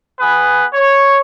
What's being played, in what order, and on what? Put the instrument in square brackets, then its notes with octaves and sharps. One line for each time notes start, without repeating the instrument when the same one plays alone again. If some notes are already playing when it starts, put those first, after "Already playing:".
[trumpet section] B3 G#4 B4
C#5